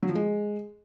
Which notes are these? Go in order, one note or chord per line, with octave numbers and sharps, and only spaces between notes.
F#3
F3
G#3